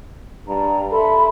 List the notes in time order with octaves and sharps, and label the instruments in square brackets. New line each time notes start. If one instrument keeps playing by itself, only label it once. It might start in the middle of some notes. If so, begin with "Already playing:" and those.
[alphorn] G2 [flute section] D5 A#5
[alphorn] A4 [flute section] E5 B5 C6